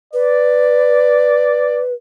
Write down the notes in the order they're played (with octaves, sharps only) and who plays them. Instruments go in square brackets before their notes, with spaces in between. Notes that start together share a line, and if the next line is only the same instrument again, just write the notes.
[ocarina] B4 [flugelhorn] D5